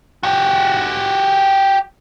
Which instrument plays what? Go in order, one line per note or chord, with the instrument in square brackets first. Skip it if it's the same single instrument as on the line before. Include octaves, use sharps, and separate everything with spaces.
[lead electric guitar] F#4 G4